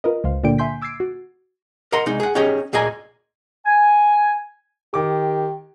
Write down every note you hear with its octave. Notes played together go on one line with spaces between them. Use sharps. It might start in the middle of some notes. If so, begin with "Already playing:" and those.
F4 A#4 B4 D#5
C#2 C5 F5
A#2 D3 A#3 D5 G5 D7
E5 G#5 C6 G6 B6
D6 E6 G#6 A6 C7 D7
F#4
A#4 D#5 F#5 A#5 C6
C2 G#3 D#4
G#4 F#5
C#4 D#4 G4 G#4 C#5 D#5
D2 A#2 G#4 D#5 G#5 A#5
G#5
D#3 G4 D6